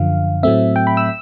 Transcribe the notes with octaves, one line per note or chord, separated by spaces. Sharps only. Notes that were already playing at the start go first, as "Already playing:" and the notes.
Already playing: F#2 D3 F3 F5
A2 F#3 A3 C4 E5
G5
B5
E6